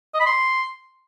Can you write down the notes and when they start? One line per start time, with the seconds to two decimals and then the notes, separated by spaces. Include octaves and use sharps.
0.14 D#5
0.20 B5
0.26 C6